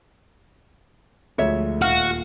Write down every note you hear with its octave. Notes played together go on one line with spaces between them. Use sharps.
D2 F3 G#3 C#5 E5
D#1 F#4 F5 F6